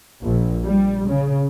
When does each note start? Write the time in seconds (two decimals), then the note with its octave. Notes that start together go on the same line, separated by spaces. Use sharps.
0.23 A#1
0.64 G3
1.08 C#3